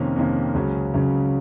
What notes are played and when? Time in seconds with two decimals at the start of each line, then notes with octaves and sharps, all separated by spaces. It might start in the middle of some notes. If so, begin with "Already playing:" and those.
Already playing: F2 C3 D#3 A#3 C#4
0.16 F2 C3 D#3 A#3 C#4
0.55 C#2 C#3 F#3 C#4
0.94 C#2 C#3 F#3 C#4